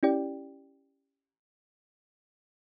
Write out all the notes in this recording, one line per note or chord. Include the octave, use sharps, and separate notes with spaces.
C#4 E4 G4 D5 G5